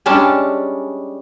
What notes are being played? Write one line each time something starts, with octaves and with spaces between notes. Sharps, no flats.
G3 G#3 C#4 D4 A5